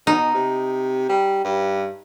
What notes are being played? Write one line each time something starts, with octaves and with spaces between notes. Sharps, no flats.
B2 D#4
C3
G3
G2